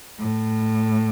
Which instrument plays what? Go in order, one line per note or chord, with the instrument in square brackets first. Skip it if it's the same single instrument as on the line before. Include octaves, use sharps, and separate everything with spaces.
[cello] A2